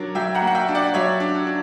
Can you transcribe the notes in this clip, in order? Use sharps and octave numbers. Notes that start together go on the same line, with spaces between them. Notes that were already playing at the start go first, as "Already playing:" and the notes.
Already playing: F#3 D4 A#4 C#5
F#3 E5 G5
F#5 A#5
A#3
F#5
E5 G5
D4
D5 F#5
F#3 C#5 E5
D4
D4